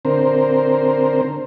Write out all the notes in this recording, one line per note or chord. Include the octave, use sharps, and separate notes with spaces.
D3 C4 A#4 C5